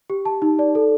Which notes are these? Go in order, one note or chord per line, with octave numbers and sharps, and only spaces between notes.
G4
A5
D#4
D5
A4